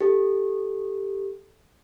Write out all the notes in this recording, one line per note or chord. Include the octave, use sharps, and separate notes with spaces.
G4 A4